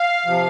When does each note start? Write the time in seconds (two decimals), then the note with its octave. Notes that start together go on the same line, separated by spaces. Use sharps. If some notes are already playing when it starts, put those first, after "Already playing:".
Already playing: F5
0.25 C3 F3